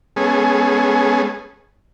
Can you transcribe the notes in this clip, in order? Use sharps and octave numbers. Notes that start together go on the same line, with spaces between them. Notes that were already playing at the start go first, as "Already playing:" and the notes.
G#3 B3 C#4 G#4 A4